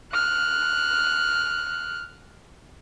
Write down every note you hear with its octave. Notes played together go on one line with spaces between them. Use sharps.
F6 F#6